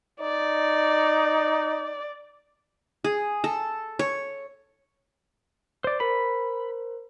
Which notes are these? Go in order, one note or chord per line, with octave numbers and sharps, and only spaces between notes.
D#4 D5
G#4
A4
C#5
C5 D5
A#4 C5 B5